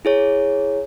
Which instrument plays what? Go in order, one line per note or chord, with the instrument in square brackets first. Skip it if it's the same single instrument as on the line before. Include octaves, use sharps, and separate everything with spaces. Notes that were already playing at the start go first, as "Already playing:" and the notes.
[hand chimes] E4 G#4 C#5